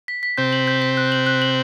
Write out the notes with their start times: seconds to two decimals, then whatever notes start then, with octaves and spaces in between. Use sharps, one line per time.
0.08 B6
0.23 B6
0.38 C3 C4 G6
0.52 F#7
0.67 G6
0.82 B6
0.97 F#6
1.12 F#7
1.27 F#6
1.42 F#7